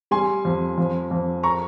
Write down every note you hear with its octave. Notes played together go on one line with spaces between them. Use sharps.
G3 G#5 C6
F2
F2
F2
A#5 C#6